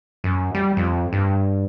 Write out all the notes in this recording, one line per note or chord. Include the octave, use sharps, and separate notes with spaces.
F#2
G3
F2
G2